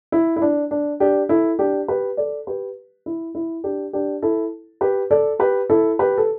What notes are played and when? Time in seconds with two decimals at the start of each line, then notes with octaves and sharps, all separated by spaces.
0.12 E4
0.36 E4
0.42 D4
0.71 D4
1.00 D4 G4
1.29 E4 A4
1.59 D4 G4
1.88 G4 B4
2.17 A4 D5
2.47 G4 B4
3.06 E4
3.35 E4
3.64 D4 G4
3.93 D4 G4
4.22 E4 A4
4.81 G4 B4
5.11 A4 D5
5.39 G4 B4
5.70 E4 A4
5.99 G4 B4
6.18 A4